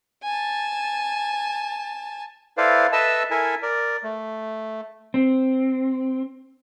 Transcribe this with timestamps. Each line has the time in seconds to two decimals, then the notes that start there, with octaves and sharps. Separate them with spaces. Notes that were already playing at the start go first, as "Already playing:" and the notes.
0.23 G#5 A5
2.57 E4 A4 B4 C5 D5 F5
2.92 A4 B4 D#5 E5 A5 E6
3.31 E4 A4 A#4 E5 G#5
3.62 A#4 D5
4.03 A3
5.14 C4